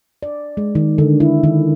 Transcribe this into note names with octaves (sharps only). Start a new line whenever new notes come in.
D5
G#3
D#3
D3
E4
D#3